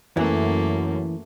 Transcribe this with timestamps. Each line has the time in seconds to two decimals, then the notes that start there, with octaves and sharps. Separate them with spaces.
0.17 F#2 E3 A3 A#3